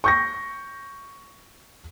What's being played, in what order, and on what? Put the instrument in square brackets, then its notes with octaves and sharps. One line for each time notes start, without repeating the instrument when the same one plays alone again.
[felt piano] C#6 G6 A#6